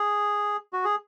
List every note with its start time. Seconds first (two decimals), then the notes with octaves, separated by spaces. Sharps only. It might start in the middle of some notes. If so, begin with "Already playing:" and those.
Already playing: G#4
0.73 F#4
0.84 G#4